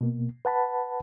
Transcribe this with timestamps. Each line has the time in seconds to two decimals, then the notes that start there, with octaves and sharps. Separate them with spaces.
0.01 B2 A#3
0.45 B4 F#5 A5 B5